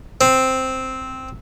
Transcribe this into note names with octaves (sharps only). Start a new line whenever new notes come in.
C4